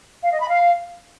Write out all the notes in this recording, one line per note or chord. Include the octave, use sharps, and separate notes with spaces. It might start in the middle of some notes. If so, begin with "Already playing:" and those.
F5
D#5
B5
F5